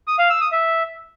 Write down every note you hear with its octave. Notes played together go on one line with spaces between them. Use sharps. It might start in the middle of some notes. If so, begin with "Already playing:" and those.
D#6
F5
E6
D#6
E5